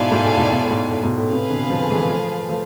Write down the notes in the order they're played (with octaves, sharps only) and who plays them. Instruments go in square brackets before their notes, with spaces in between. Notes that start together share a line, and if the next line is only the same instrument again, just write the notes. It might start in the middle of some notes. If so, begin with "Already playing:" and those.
Already playing: [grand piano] G#2 B2 [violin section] E4 A4 D5 F5 G#5
[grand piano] G#2
A2
G#2 B2
G#2 B2
A2
G#2
A2
G#2 B2
A2
[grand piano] A2 C3 [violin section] G#4 B4 F5
[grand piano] B2 D3
D3 F3
E3 G#3
F3 A3
F3 A3